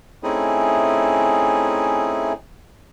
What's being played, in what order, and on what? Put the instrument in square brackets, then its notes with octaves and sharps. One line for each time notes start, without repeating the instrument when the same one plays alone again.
[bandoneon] A3 C4 C#4 D#4 E4 G#4